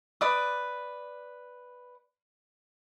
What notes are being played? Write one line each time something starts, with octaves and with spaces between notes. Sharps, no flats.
B4 D5 D#6